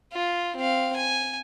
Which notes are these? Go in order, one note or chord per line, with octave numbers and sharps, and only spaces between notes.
F4
C4 F5
G#5